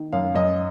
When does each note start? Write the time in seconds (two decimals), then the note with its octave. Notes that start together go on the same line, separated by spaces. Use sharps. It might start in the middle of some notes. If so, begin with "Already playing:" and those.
Already playing: D#3
0.12 F#2 F5
0.34 F#2 D#5